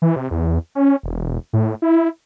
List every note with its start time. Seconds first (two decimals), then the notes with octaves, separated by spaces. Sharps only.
0.02 E3
0.16 C3
0.31 E2
0.75 C#4
1.03 E1
1.53 A2
1.82 E4